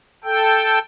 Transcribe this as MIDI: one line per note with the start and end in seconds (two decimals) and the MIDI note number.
0.24 0.79 69
0.24 0.79 79